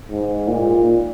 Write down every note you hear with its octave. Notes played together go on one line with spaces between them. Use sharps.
G#2
A#2